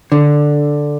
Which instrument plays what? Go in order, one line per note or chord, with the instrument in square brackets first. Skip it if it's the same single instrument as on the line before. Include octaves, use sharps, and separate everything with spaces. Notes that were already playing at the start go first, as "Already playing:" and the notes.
[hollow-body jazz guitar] D3